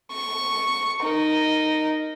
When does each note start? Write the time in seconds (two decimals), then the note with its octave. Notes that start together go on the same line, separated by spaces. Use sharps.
0.12 C#6
1.01 D#4 A#4